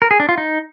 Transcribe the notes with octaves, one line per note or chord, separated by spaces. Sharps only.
A#4
G#4
D4
F4
D#4